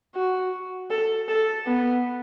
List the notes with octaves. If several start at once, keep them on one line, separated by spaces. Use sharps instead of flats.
F#4
A4
A4
B3